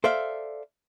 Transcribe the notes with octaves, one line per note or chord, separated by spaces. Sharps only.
A4 C5 D5 E5 F5